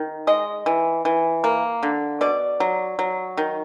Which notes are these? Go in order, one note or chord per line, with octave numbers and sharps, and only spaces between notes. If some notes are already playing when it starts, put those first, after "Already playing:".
Already playing: D#3
G#3 D#5
E3
E3
A#3
D3
B2 D5
F#3
F#3
D#3